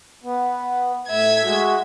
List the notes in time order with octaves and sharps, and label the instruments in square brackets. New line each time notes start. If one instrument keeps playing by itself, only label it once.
[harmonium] B3
[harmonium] A2 [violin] E5 G#6
[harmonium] G#3 F#4